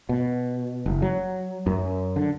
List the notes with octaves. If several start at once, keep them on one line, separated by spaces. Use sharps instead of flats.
B2
F#1
F#3
F#2
D3